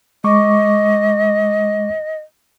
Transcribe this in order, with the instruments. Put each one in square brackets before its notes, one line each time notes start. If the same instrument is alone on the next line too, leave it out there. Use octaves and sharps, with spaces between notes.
[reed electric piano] G#3 C#6 D6 [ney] D#5